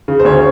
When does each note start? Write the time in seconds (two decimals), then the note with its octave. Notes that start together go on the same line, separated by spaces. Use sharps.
0.08 C#3
0.20 C5
0.25 D2 C#5